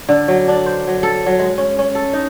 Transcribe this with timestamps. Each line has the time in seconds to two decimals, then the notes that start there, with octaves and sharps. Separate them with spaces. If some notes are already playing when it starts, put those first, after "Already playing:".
0.09 D3
0.28 F#3
0.48 D4
0.66 C5
0.87 F#3
1.03 A4
1.26 F#3
1.39 G#3
1.58 C#4
1.79 C#4
1.95 A4
2.13 D#4